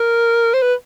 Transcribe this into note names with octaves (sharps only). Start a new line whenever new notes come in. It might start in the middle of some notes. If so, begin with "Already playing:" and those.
Already playing: A#4
C5
B4